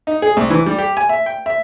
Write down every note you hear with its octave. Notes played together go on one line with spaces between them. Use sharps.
D#4
G#4
C2
E3
G3
G4
G#5
E5
G5
E5